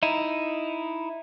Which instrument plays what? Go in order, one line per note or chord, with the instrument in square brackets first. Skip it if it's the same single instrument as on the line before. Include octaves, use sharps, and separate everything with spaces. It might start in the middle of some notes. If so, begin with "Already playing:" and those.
[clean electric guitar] D#4 E4